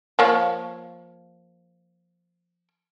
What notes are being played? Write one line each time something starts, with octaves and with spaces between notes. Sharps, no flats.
F3 A#3 C#5